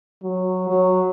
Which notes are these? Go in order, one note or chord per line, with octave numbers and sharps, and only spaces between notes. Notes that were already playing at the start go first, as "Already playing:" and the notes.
F#3
F#3